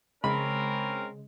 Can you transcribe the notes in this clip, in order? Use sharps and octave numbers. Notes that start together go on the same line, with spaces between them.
C#3 G#3 C4 C#4 A#4 B5